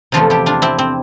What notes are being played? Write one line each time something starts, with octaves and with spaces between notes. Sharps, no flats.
E2 C3 F3 A3 F4 A4
E4 G4
D4 F4
C4 E4
C4